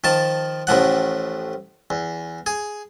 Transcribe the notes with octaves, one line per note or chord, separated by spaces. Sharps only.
D#3 F3 A5
A1 A2 F3 F#5
E2
G#4